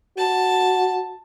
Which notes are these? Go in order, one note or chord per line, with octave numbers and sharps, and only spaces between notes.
F#4 A5